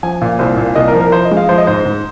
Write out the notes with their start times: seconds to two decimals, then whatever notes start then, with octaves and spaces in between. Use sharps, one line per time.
0.03 F3 G#5
0.21 A#2
0.39 C2 C5
0.57 A#2
0.75 C2 D#5
0.88 A#4
0.94 F3
1.00 A#4
1.12 F3 C5
1.25 D#5
1.31 G#3
1.37 F5
1.49 F3 C5
1.58 D#5
1.67 G#2 C5
1.85 G#2